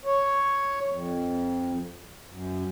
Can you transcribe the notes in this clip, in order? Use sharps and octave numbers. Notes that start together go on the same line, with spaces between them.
C#5
F2
F#2